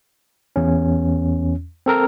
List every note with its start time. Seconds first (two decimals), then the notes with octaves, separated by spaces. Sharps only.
0.56 E2 C#4
1.86 C4 A4 A#4